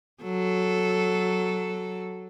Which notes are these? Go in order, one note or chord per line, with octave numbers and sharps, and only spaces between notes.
F#3 A4